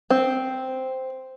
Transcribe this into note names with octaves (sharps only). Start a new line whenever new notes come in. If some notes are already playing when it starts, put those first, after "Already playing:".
C4